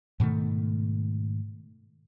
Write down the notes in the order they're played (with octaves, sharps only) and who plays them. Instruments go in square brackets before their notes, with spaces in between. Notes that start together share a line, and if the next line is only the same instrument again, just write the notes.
[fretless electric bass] G#2 B2 D#3 A3